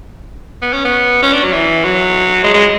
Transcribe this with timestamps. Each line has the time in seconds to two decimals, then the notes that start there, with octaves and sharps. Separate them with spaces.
0.62 B3
0.73 C#4
0.84 B3
1.22 C#4
1.33 D4
1.43 F#3
1.52 E3
1.84 F#3
2.43 G#3
2.54 G#3